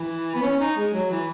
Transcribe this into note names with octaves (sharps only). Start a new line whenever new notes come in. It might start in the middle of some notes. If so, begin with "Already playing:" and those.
Already playing: E3
B3
C#4
D#4
G#3
F#3
E3